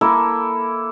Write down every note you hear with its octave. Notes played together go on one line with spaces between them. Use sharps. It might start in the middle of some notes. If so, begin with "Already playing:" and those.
A#3 E4 A4